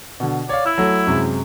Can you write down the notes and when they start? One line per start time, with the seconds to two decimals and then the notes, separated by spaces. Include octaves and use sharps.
0.20 B2 D3
0.49 C#5 D5 F5
0.66 E4 E6
0.78 F#3 A3
1.07 F#2 C3 G#3